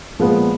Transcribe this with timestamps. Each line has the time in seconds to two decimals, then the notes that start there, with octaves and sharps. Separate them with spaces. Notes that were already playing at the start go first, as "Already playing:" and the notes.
0.19 A#2 F3 G#3 B3